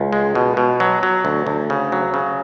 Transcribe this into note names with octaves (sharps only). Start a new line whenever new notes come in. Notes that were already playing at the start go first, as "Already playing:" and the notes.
Already playing: C#2
G#3
B2
B2
F#3
F#3
D2
D2
C#3
F#3
C#3